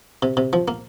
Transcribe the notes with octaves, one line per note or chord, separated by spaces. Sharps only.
C3
C3
F3
A#3